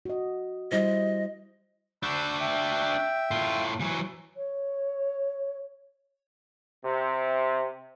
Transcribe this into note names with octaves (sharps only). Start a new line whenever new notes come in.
F#4 D#5
G3 E4 C5 D#5
D4 F#4 B5 E6 G6
E5 G5
A2 F4
E3 F#3
C#5
C3